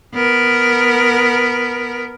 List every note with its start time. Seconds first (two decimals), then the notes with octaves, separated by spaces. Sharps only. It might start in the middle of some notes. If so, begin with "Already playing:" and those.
0.14 B3 A#4